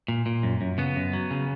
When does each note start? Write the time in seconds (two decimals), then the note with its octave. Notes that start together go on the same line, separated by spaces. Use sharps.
0.08 A#2
0.26 A#2
0.43 F#2
0.61 F#2
0.78 C#3 B3
0.96 F#2
1.13 F#3
1.31 C#3